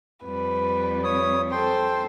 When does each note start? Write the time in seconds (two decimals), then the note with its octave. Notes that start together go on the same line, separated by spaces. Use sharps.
0.25 F2 G3 B4
1.04 C#5 D#6
1.52 A4 C5 G5 C6